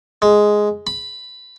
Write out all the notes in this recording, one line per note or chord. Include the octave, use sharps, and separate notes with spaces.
G#3
B5